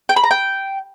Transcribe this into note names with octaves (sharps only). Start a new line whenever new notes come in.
G5
B5
A#5
G5